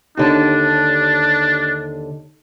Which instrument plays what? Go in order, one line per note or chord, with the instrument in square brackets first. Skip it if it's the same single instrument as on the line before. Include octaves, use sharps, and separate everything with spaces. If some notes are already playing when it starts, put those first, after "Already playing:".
[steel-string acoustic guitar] D#2 D3 A5 [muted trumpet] D4 [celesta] D#4 G4 C#5